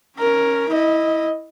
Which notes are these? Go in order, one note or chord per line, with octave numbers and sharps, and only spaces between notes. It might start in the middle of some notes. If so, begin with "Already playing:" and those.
C#4 A#4
E4 D#5